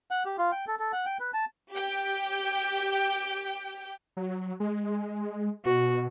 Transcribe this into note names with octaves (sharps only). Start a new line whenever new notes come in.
F#5
G4
F4
G5
A4
A4
F#5
G5
B4
A5
G4 G5
F#3
G#3
B2 F#4